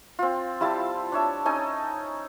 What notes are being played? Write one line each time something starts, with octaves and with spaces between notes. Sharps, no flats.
C4 F4
G3 E4 F4 A5
D4 C#5 E5
C#4 D#4 A4 G#5